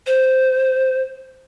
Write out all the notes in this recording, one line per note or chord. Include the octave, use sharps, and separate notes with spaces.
C5